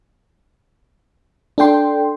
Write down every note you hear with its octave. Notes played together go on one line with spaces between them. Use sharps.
D4 A4 G5 C6